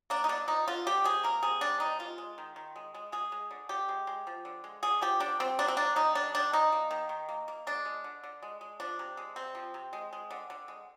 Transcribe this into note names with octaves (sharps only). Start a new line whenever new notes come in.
A#3 D4
D#4
D3 D4
F3 D#4
D3 F4
G3 G4
C3 G#4
A#3 A#4
C3 G#4
G3 D4
C3 D#4
G#3 F4
G#3
D#3
D#3
G#3
G#3
G#3 G#4
G#3
D3
D3 G4
G#3
G#3
F3
D3
G#3
D3 G#4
F3 G4
D3 D4
G3 C4
D#3 D4
C4
A#3 D4
D#3 D#4
G3 D4
D#3 D4
A#3 D#4
A#3
D#3
D#3
A#3
A#3
G#3 D4
G#3
D3
D3
G#3
G#3
F3 D4
C3
G#3
C3 C4
F3
C3
G#3
G#3
D3
D3
G#3